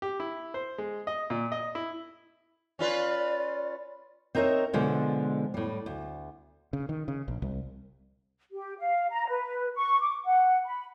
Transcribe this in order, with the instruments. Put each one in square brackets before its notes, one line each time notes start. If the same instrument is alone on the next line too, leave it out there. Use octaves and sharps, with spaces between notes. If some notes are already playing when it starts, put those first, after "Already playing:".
[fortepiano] G4
E4
C5
G#3
D#5
A#2
D#5
E4
[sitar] C#4 F4 B4 [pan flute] D5
[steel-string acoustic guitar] C4 D#4 A#4 C#5 E5
B2 D3 F3 G#3 A4
A2 G3
D2
[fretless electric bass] C#3
D#3
C#3
A#1
C2
[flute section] G4
F5
A#5
B4
C#6
D6
F#5
B5